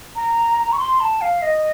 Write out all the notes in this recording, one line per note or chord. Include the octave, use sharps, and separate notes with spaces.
A#5
C#6
C6
A5
F5
D#5